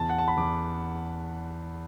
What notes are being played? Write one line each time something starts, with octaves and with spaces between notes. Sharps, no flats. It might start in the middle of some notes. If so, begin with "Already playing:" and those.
Already playing: E2 A5
F#5
A5
B5
E2 D6